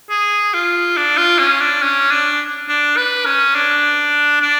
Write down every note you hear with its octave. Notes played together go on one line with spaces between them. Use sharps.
G#4
F4
D4
F4
C#4
D4
C#4
D4
D4
B4
C#4
D4
D4